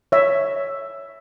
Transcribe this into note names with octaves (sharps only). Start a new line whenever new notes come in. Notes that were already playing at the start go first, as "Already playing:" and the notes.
C#5 E5